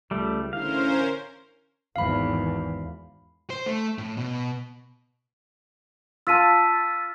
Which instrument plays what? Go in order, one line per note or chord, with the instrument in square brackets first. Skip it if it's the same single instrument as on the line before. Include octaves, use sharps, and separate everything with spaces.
[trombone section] C#2 [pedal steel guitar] G3 A3
[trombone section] A1 D3 E4 [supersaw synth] C#4 A#4 C5 [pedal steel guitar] F5
[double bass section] G#1 E2 [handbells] F5 B5
[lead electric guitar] C5
A3
A2
B2
[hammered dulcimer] F4 A5 [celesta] E6 B6 D#7